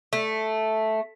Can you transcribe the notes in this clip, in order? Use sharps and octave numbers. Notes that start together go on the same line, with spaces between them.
A3